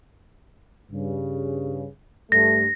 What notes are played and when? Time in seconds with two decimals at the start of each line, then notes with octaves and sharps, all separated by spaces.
0.92 G2 C#3
2.32 G2 A3 A#6